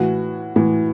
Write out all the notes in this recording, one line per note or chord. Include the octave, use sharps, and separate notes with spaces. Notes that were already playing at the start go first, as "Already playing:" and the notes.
Already playing: A2 E3 F#4
A2 E3